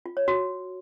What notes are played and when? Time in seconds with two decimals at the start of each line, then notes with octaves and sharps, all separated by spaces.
0.06 F4
0.17 C#5
0.28 F#4